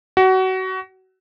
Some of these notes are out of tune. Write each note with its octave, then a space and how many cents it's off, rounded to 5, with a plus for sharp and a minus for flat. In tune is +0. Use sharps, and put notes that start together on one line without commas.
F#4 +25